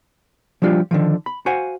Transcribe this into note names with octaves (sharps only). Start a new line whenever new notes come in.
F3 G3 D4 F4 G4
D3 D#3 F3
B5
F#4 C5 F5 F#5 G#5